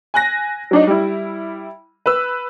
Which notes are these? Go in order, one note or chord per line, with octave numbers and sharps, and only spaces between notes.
G#5 F#6 A#6
F#3 D4 D#4
G3 E4
B4 E6